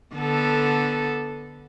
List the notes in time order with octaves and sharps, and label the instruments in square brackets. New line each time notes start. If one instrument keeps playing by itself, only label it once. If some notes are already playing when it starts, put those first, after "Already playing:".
[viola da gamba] D3 B3 A4